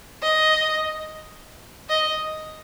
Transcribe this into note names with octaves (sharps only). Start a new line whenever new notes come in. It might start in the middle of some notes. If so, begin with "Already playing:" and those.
D#5
D#5